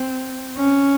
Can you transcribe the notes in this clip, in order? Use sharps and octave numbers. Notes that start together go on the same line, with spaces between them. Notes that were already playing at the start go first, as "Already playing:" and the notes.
Already playing: C4
C#4